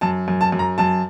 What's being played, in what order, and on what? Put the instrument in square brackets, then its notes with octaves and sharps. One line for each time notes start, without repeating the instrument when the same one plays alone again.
[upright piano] F#2 A5
F#2
A5
F#2
A#5
F#2 A5